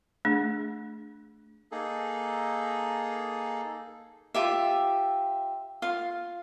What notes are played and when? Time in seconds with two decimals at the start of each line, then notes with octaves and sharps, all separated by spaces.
0.25 A3 D4 G#4
1.72 A#3 D#4 G#4 A4
4.34 F4 G4 E5
5.82 F4 F5